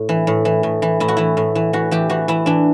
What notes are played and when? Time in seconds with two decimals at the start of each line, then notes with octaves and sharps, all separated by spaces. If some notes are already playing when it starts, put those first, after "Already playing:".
Already playing: A2
0.09 E3
0.27 A2
0.45 E3
0.63 A2
0.82 E3
1.00 A2 E4
1.08 F#4
1.17 E3 E4
1.37 A2
1.55 E3
1.73 E3 F#4
1.91 E3 G4
2.10 E3 F#4
2.28 E3 E4
2.46 E3 D4